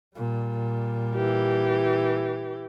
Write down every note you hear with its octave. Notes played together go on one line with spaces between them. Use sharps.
A#2 G3
E3 G4